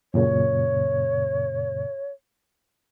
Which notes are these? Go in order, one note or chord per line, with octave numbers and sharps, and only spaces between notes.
F#2 A#2 C#3 C#5